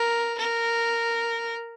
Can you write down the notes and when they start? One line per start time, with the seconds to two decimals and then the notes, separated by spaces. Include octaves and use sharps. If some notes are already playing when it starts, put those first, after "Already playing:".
Already playing: A#4
0.38 A#4